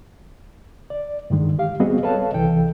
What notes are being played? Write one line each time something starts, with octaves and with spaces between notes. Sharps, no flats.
D5
G2 D3 D#3 G#3
G4 F5
G3 B3 C4 F#4 G#4 D#5
A4 B4 C#5 D#5 F5 A5
C2 E3 A4 G5